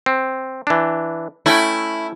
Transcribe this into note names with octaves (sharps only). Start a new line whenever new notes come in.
C4
E3 D4
A3 C#4 E4 G5